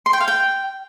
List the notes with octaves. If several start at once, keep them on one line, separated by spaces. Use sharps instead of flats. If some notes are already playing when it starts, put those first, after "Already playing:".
C6
G5
F5
G5